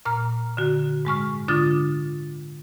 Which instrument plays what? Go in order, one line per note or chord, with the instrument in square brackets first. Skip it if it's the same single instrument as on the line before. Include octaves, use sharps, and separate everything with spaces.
[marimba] A#2 A#5 F6
D3 F#4
G#2 G#3 C#6 F6
D3 D4 F4 D#6 A6